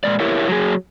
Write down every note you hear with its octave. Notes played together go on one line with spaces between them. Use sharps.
A#2 G#3 D5
E4 G4 A#4 C#5 E5
F#3 G#4